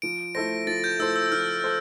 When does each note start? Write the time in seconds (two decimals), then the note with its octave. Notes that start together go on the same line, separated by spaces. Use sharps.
0.02 F3 D7
0.35 A3 E4 A4 C5 A#6
0.67 F3 A6
0.84 G6
0.99 A3 E4 A4 C5 E6
1.16 E6
1.26 E6
1.32 F3 F6
1.64 A4 C5